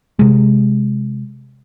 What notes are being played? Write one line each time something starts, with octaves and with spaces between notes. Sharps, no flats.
C3 G#3